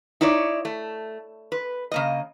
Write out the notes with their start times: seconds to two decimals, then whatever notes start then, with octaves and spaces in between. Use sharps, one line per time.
0.21 D#4 E4 C#5 D5
0.65 A3
1.52 B4
1.92 C#3 A#3 D#5